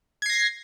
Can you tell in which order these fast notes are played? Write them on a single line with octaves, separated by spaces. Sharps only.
G#6 C7 A#6